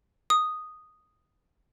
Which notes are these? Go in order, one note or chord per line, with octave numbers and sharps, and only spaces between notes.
D#6